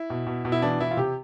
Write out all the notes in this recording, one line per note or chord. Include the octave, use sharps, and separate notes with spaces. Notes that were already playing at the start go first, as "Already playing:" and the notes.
Already playing: E4
B2
B2
B2
E4
E3 D4
E3 E4
F4
C3 G4